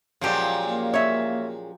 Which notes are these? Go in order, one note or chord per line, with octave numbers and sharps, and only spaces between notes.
A#2 F3 F#3 G#3 C#4 G4
A#3
C#5 E5